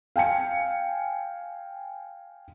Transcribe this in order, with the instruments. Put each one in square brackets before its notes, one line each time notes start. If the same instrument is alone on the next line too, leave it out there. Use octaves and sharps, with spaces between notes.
[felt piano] F5 G5 G#5 C#7